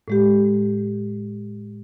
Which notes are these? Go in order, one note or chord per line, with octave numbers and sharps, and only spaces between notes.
A2 G#3 G4